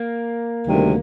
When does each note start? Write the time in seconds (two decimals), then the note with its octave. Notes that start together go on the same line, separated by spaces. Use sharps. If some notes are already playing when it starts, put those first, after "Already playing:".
Already playing: A#3
0.66 D2 C3 D#3 G3